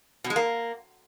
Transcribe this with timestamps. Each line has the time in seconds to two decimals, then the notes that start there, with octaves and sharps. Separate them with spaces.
0.24 B2
0.30 G#3
0.36 A#3